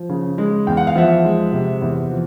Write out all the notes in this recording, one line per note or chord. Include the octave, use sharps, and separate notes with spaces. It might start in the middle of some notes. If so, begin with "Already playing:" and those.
Already playing: F3
C#3
G#3
E2 G5
F#5
F5
F3 E5 F#5
G#3
C3
E2
F3